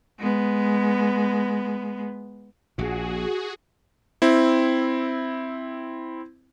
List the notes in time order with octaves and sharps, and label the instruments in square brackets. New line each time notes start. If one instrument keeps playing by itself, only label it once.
[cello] G#3 B3
[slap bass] A#1 A#2 [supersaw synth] F#4 G#4
[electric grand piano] C4 E4